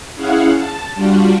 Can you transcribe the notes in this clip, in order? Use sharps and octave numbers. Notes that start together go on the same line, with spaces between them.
C#4 E4 G#4 F5 F#5
A5
G3 D4 F4 F#4